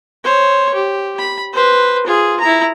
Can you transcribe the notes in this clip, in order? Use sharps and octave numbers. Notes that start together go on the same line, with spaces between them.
C5 C#5
G4
B5
B4 C5
F4 G#4
E4 A#5